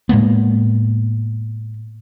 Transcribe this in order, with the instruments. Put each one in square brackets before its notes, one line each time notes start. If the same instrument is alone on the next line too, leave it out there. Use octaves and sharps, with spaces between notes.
[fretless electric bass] A2 G#3 A#3 B3